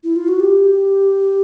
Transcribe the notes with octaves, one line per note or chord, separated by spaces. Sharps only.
E4
F4
F#4
G4